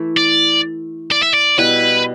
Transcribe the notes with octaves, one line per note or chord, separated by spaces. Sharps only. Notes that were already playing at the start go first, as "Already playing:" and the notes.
Already playing: E3 A3 E4
D5
D5
E5
D5
B2 G3 E4 B4